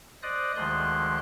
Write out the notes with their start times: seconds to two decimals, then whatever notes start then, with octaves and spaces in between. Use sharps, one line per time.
0.22 C5 D5 D#5 D#6 F#6
0.56 D2 D#3 F3 G#3 C6 F#6